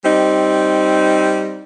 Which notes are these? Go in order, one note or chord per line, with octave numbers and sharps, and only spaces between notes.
G3 C4 D#4